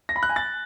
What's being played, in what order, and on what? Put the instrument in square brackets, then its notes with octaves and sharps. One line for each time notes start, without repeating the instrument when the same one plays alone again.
[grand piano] A#6
B5
F#6
G#5
A6